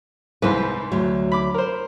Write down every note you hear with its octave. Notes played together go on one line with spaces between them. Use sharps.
C2 G#2 B4 C5
D2 F#3
B5 D6
A#4 C5